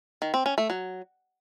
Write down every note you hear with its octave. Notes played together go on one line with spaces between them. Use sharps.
D#3
C4
C#4
A3
F#3